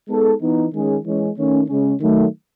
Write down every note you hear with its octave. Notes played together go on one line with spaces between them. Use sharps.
G#3 B3 D#4 A4
E3 B3 D#4
D#3 G#3 C#4 G#4
E3 G#3 C#4
D#3 A3 C#4
C#3 G#3 C#4
D#3 F#3 A3